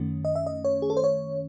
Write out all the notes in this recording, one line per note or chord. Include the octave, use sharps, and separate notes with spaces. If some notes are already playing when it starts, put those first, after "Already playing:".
Already playing: F#2 D#3 A3 C#4
D#5
E5
D#5
C#5
G#4
A4
C5
C#5